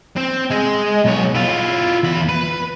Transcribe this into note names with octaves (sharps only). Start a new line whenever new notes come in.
C4
G#3
B1 C#5
E4 F4
E2 B5
B4